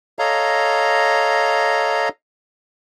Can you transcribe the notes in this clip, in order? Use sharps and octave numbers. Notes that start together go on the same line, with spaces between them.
A4 C#5 D#5 F5 A#5